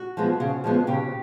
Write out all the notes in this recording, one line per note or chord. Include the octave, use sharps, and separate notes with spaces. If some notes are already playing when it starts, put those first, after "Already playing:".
Already playing: F#4
F3 G#3 B3
C#3
F3 G#3 B3
C#3 G4